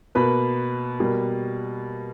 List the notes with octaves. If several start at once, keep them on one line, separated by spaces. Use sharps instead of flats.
B2 A#3 B4 B5
B2 G3 A#3